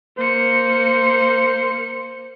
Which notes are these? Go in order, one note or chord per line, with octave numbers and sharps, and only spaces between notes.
A#3 C5 C#7